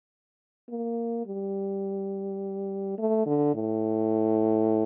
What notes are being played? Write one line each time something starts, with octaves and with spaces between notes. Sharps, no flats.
A#3
G3
A3
D3
A2